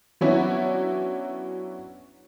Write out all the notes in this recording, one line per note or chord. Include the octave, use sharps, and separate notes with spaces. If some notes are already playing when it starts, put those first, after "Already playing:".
F#3 B3 C#4 D4 E4 F#4